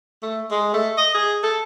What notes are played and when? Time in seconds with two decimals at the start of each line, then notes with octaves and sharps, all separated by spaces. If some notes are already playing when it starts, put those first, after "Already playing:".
0.23 A3
0.51 G#3
0.74 A3
0.97 D#5
1.14 G#4
1.43 A4